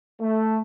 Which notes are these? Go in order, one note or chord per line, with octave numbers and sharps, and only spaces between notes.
A3